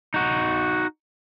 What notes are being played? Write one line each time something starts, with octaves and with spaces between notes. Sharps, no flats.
D#4 F#4